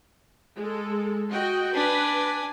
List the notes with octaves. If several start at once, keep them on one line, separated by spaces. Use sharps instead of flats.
G#3 A4
F#4 D#5 G5
D4 B4 G#5